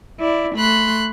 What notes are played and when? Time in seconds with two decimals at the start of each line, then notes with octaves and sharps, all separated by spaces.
0.19 E4 D5
0.56 A3 B5 C6 F#6